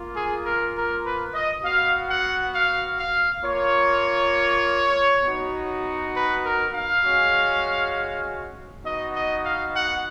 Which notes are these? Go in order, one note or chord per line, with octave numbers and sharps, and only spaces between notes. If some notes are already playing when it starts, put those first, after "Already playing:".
Already playing: A#3 F4
G#4
A#4
A#4
B4
D#5
B3 F#4 F5
F#5
F5
F5
A#3 F4 C#5
B3 D#4 F#4
B4
A#4
F5
G#3 C#4 F#4
B3 D#4 F#4 D#5
D#5
F5
F#5